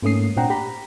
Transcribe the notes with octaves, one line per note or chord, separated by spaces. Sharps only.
G#2 A3 A#3 C#4 D#6 C7
A#2 C4 D4 F#5 G5 A#5
G4 A#5 B5